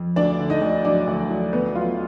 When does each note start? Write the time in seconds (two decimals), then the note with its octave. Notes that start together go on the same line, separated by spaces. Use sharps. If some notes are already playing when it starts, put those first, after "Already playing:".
Already playing: F2
0.16 D2 D4 D5
0.39 D3
0.50 D#4 D#5
0.62 D2
0.85 F#3 D4 D5
1.07 D2
1.30 F#3
1.53 D2 B3 B4
1.75 F#3 F4